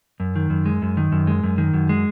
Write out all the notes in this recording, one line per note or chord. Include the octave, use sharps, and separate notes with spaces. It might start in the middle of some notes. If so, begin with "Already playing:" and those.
F#2
D#3
F#2
G#3
F#2
D#3
F#2
G#3
F#2
D#3
F#2
G#3